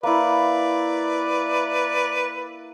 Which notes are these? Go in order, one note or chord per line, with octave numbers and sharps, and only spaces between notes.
A#3 E4 B4 D5